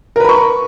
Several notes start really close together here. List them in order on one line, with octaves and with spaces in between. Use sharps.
A#4 B4 B5 C#6